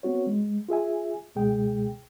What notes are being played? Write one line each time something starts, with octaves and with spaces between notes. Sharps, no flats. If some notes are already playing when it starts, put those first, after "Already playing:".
B3 C4 F#4 C#5
G#3
F4 G#4 E5 G#5
C#2 B2 G#3 G#4 G5